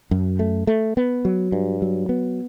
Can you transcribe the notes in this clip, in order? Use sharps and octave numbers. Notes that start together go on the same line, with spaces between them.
F#2
A3
A3
B3
F#3
G2
F#3
B3